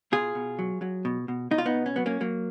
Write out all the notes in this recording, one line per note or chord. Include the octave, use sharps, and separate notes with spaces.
B2 F4 G#4
B2
F#3
F#3
B2
B2
B2 D#4
F4
B3 D#4
B2
C#4
F#3 B3
A#3 C#4
F#3 A#3